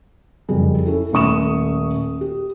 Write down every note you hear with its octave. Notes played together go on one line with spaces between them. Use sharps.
F#1 F2 G3 G#4
C#4 E4 A4
D#1 A3 C#4 C#6 D#6 E7
G4